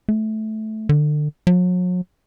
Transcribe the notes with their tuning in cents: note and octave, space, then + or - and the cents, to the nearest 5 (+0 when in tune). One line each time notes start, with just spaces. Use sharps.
A3 -15
D3 +30
F#3 -40